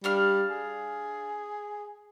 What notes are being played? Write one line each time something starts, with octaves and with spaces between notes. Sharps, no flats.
G3 D4 F5 F6
G#4